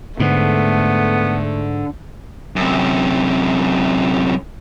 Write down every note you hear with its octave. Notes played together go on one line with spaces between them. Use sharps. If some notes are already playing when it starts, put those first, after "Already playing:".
G#2 D3 A3 B3
F#2 C3